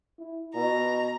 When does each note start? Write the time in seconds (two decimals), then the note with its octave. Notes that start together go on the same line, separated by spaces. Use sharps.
0.19 E4
0.55 B2 A#5